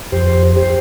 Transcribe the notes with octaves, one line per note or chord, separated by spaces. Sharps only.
F2 G4 C5
G4 C5